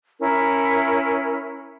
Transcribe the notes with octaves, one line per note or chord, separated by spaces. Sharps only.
C#4 E4 A#4